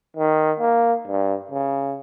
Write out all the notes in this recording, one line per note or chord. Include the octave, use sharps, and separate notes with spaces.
D#3
A#3
G2
C#3